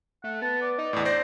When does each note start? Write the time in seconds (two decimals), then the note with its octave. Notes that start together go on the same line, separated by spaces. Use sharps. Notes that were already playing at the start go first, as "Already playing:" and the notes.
0.24 A3 F#5
0.42 B3 A5
0.62 D5
0.78 D#4
0.93 E2 A2 D4
1.05 C4 C5 D5 A#6